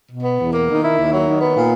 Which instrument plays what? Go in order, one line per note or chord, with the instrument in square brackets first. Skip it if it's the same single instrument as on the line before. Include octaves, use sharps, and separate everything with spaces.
[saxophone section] B2
B3
E2
A#3
D#3
E4
D#2
F#3
D#3
B3
A#2